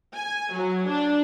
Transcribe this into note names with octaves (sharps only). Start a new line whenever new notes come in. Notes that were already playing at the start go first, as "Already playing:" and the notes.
G#5
F#3
D4